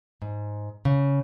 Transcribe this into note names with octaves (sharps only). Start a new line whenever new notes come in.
G#2
C#3